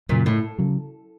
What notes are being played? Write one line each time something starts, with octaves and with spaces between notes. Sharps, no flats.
F#2 A#2 C#3 F#3
A2
C#3 F#3